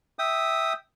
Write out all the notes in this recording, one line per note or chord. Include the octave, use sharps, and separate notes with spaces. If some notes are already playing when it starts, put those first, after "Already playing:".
E5 G5 D#6